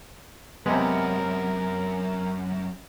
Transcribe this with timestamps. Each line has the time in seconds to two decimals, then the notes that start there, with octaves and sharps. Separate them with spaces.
0.66 F#2 C3 G#3 B3 A#4